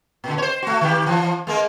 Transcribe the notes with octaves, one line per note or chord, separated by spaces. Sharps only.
A#2 D3
C5 C#5
A3 F#4
D#3 G4
E3 F3
G#3 A#3 A#4